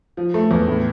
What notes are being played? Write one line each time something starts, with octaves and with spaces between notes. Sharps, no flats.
F3
A3
E2
A2